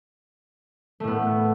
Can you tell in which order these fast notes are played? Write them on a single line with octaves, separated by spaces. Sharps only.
A3 A2 B3